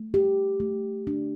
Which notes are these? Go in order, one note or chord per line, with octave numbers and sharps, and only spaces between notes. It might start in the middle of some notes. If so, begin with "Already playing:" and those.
Already playing: A3
G4
A3
D4